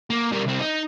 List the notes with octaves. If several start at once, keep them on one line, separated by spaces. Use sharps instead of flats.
A#3
G3 A#4
C2 C4
D#4